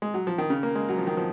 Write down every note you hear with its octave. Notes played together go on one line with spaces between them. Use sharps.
G#3
F#3
F3
D#3
C#3
A#3
G#3
F#3
F3
D#3
F3